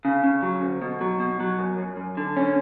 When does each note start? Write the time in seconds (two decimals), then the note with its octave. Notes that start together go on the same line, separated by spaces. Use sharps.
0.05 C#3
0.24 C#3
0.43 F#3
0.62 D2
0.82 B2
1.01 F#3
1.20 B2
1.40 F#3
1.59 F#2
1.78 F#2
1.97 F#2
2.17 D3
2.37 C#4